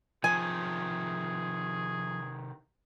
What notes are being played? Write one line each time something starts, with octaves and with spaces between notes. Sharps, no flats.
C3 D#3 F3 G#4 G#5